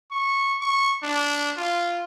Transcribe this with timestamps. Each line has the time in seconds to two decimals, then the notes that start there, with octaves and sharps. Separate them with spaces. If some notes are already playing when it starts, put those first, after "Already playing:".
0.11 C#6
0.61 C#6
1.03 D4
1.57 F4